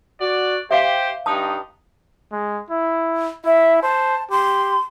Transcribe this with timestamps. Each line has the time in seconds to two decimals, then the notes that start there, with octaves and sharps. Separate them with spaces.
0.20 F#4 D5
0.71 G4 C5 E5 F5
1.26 G2 D#4 A5 D#6
2.32 G#3
2.70 E4
3.45 E4 E5
3.82 C5 A5
4.31 G4 C6